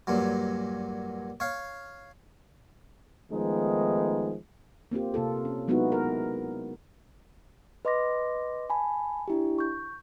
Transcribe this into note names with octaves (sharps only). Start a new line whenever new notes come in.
G2 A#2 F#3
C#5 F5
D#3 F3 G#3 A3 B3 D#4
A#3 C4 F4 G4
C3 A#3 F4 A4
C#4
F#3 G#3 B3 D#4 E4 F#4
A#4
B4 D#5 C6 D6 A#6
G#5 A5 B5
D4 E4 G4
C#6 G6